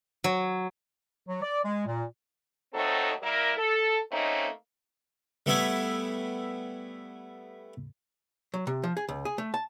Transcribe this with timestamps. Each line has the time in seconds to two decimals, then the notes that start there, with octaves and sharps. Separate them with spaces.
0.24 F#3
1.27 F#3
1.41 D5
1.64 G#3
1.86 A#2
2.74 D#2 F#3 A3 C4 D#4 A4
3.22 G3 A#3 E4 A#4
3.57 A4
4.12 A3 A#3 C4 C#4 D#4
5.46 G3 A3 B3 E4 E5 G#5
8.54 F#3
8.67 C3
8.84 F3
8.97 G#4
9.09 C#2
9.25 G#4
9.38 A3
9.54 A5